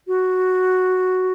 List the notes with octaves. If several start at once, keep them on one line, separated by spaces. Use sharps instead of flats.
F#4